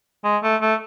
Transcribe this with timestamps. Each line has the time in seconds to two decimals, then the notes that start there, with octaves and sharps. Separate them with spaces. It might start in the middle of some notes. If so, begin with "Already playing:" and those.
0.24 G#3
0.43 A3
0.62 A3